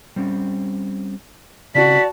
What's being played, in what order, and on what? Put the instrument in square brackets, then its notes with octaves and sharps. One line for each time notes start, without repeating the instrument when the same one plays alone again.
[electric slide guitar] G3 C4 C#4
[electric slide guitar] C#3 C4 C#4 [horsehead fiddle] F#4 A5 [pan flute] D5 [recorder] B6